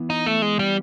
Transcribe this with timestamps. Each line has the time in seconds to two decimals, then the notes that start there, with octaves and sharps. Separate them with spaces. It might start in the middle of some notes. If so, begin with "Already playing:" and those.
Already playing: E3 B3
0.10 D#4
0.26 A3
0.42 G#3
0.59 G3